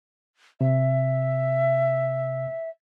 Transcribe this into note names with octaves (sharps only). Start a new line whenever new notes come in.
C3 E5